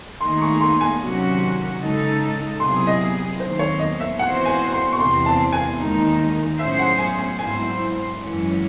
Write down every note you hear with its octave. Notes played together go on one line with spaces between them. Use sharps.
D#2 D#3 A3 D#4 G#4 C6
C#6
C6
G#5
C3 D#3 F#3 C#4 F#4
C#3 G#3 D#4 A4
C3 F#3 C4 E4 G#4 C6
D#5
D#2 D#3 F#3 C4 C5
C#5
D#5
E5
E3 C4 F#4 C5 F#5
G#5
C6
C#6
E2 C3 E3 C4 C6
A5
G#5
D#2 D#3 G#3 D#4
A2 F#3 C#4 G#4 C5 E5
F#5
G#5
G#5
G#2 F#3 C4 E4 C5 G#5
F#2 E3 G#3 C#4